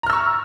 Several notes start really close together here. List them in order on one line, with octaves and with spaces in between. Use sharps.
A#5 F6 E6 C#6